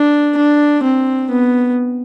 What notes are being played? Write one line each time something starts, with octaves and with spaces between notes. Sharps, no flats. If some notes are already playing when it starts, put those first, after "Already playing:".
Already playing: D4
D4
C4
B3